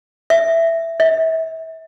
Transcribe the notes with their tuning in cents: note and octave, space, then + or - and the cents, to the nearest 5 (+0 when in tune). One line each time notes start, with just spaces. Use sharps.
E5 +5
E5 -30